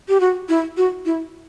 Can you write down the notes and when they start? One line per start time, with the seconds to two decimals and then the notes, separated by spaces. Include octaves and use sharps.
0.09 G4
0.20 F#4
0.49 E4
0.77 F#4
1.06 E4